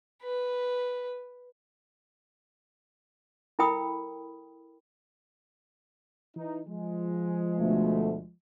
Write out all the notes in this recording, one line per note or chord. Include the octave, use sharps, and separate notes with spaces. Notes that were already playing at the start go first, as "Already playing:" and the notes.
B4
E4 A4 A#4 G5 B5 D#6
E3 D#4
F3 G#3
D2 B2 A3